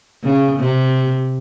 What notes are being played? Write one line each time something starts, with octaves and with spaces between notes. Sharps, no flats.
C#3
C3